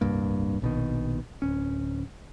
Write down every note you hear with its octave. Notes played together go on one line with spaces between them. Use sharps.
D1 C2 G2 A#3
A#1 B2 D#3
D1 C#4